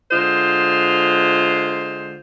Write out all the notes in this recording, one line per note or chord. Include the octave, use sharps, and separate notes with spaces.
D3 G#3 F4 C5